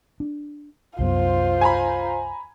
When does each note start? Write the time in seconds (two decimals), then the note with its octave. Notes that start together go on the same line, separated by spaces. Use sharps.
0.20 D4
0.99 C2 F#2 B3 F4 C5
1.61 G#5 A#5 B5